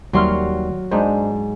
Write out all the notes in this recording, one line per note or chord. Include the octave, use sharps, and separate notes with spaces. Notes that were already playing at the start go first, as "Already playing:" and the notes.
D#2 F#3 G3 E5 C6 F6
G#2 D4 D#4 C5